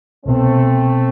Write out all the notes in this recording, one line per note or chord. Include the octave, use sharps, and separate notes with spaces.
C2 B2 A3 B3 C4